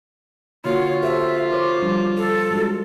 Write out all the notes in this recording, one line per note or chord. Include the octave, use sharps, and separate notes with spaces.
D3 A#3 F4 F#4 C#5
G4 A4 C5 E5
A#4 C5 C#5 D6
F3 G3 D4
A4
F#3 G#3 D4